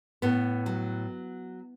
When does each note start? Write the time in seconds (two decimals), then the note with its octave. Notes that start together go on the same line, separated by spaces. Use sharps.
0.22 A2 B3
0.66 F#3